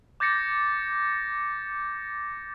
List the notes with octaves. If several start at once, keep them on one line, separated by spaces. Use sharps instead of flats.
D6 G6 A6 A#6 C#7